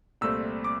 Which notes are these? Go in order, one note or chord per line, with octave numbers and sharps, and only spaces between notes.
C2 A#2 A3 C4 E6
D6